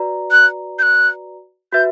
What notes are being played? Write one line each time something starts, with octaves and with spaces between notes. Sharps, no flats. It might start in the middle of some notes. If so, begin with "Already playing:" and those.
Already playing: F#4 B4 D5 A#5
F#6
G6
F#6
F#4 B4 E5 G6